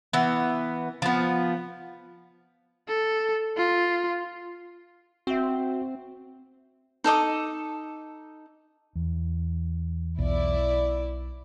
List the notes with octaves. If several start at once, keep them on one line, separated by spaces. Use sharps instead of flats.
E3 B3
F3 B3
A4
F4
C4 F#4 E5
D#4 A4 D#5 D6
E2
B1 E4 D5